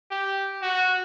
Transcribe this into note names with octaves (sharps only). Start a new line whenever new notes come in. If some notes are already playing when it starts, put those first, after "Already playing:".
G4
F#4